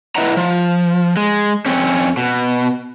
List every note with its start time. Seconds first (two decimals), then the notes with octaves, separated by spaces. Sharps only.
0.16 E4 B4 D#5 E5 F#5 A#5
0.37 F3
1.17 G#3
1.66 F2 C4 C#4
2.17 B2